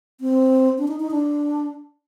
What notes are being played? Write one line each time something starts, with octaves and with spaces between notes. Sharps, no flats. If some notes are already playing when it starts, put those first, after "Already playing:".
C4
D4
D#4
D#4
D4